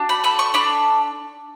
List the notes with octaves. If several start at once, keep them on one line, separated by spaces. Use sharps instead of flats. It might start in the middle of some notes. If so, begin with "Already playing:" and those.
Already playing: D4 F#4
B5
A4 B5
C#6
D4 B5